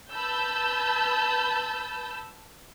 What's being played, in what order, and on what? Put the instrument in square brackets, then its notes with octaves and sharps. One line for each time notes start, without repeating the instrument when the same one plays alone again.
[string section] B4 A5 B5 E6 G6